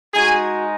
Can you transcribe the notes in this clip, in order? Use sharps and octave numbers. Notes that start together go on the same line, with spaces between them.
G#3 D#4 F#4 G#4 G#5